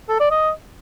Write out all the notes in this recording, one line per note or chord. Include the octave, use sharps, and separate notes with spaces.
A4
D5
D#5